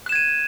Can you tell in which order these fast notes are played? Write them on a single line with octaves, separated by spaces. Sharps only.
F#6 E7 G#6 D#7